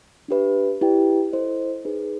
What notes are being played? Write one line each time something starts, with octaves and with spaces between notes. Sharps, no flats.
D4 G4 B4 E5
E4 G4 B4 D5 G5
E4 A4 C5 D#5
D#4 G#4 B4